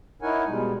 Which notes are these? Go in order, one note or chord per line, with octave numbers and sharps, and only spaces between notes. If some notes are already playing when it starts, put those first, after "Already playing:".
D#4 E4 A#4 C#5 F#5 G#5
B2 G3 G#3